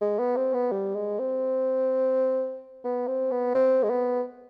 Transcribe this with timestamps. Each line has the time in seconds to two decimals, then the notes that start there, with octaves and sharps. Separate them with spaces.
0.01 G#3
0.19 B3
0.36 C4
0.54 B3
0.71 G3
0.95 G#3
1.19 C4
2.84 B3
3.07 C4
3.31 B3
3.54 C4
3.83 G#3
3.90 B3